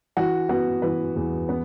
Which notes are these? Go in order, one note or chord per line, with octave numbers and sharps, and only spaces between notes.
E3 F#4
B3 F#4
E3 B4
E2
B3